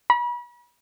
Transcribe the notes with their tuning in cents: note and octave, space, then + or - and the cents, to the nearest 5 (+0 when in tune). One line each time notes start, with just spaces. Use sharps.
B5 -40